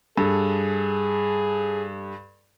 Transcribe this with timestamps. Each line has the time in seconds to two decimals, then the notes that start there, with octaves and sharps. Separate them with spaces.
0.17 G2 G#4 A4